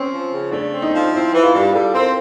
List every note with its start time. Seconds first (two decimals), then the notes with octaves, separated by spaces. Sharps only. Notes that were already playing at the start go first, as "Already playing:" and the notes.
Already playing: C4 C#4
0.11 F3
0.31 C#3
0.51 A3 D4
0.72 C4
0.82 D#4
0.93 F3
1.12 C4 E4
1.33 E3
1.43 F4
1.54 G2
1.73 G3 A4
1.94 C4 A#4